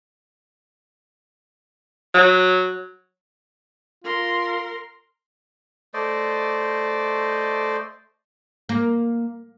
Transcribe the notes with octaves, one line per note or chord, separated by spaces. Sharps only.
F#3
F4 A#4 C6
A3 C5 D5 D#5
A#3